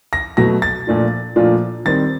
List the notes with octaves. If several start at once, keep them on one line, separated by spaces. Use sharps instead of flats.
A#6
B2 F#3 A3 A#6
A6
A#2 F3 A3 D4 F4
A#2 F3 A3 D4 F4
D#3 G3 C4 A6